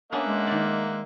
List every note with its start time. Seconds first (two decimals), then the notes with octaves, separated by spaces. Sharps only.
0.12 A#3 B3 C#4 D4 E5 F#5
0.26 G#3
0.47 D#3 D5